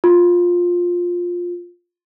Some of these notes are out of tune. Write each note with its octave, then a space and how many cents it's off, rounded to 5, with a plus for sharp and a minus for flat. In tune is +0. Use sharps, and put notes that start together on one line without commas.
F4 +10